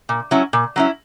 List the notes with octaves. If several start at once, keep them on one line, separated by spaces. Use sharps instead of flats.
A#2
F#3 C#4 E4
A#2
F#3 C#4 E4